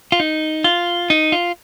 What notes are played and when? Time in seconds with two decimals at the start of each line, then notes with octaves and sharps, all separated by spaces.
0.12 F4
0.20 D#4
0.64 F4
1.10 D#4
1.32 F4